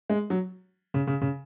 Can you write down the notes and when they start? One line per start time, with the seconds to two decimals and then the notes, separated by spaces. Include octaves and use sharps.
0.10 G#3
0.30 F#3
0.94 C#3
1.07 C#3
1.21 C#3